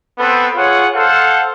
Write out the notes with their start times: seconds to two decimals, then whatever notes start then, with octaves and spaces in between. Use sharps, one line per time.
0.19 B3 C4 A4 B4
0.56 F4 G#4 C#5 F#5
0.94 A4 C5 F5 F#5